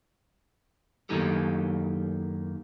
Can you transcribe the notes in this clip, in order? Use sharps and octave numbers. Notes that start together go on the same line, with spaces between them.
F#2 D#3 A#3 D#4 G4 A4